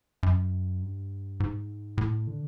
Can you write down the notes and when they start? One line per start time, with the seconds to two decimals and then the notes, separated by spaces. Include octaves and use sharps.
0.23 F#2
0.82 G2
1.40 G#2
1.98 A2
2.27 D3